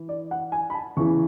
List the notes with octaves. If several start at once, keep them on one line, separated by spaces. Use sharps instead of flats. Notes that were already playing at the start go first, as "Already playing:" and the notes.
Already playing: E3
D5
F#5
G#5
B5
A5
E2 C#3 E3 C#6